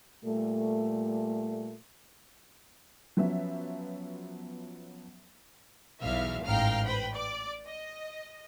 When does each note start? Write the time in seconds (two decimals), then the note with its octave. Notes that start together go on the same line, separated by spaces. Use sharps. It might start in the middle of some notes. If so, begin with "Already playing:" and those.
0.25 A#2 G3 A3
3.17 F3 F#3 B3 C#4 E5
6.02 B1 E2 E3 E5 F5 F6
6.45 A1 G#2 F5 G5 A#5 F6
6.84 B4 C5 G5 B5
7.13 D5 D6
7.67 D#5